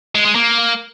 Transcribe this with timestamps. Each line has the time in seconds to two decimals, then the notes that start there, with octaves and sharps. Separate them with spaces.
0.15 G#3
0.25 G#3
0.35 A#3